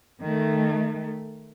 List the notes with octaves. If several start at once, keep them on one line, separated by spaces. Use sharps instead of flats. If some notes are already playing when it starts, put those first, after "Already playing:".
D#3 A3